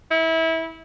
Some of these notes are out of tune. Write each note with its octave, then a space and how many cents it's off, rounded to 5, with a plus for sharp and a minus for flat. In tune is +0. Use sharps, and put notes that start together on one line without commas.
E4 -25